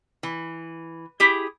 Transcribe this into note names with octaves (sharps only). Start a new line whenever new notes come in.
E3
E4 G4 G#4